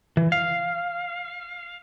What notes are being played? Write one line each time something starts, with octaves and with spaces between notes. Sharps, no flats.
E3
F5